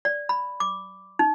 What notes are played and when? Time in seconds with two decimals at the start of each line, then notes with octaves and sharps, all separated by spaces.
0.05 D5
0.29 B5
0.60 D6
1.19 D#4